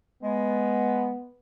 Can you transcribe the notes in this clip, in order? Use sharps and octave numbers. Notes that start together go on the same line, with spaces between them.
G#3 B3